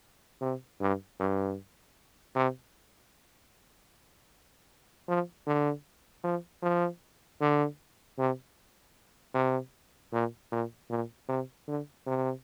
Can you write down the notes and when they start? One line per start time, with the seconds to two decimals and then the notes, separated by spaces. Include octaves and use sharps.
0.41 C3
0.81 G2
1.20 G2
2.35 C3
5.08 F3
5.47 D3
6.24 F3
6.62 F3
7.41 D3
8.18 C3
9.34 C3
10.13 A#2
10.52 A#2
10.90 A#2
11.29 C3
11.68 D3
12.07 C3